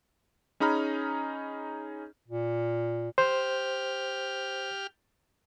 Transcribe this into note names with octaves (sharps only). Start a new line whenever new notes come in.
C#4 D#4 G#4 A#5 B5 F6
A#2
G4 C5 F6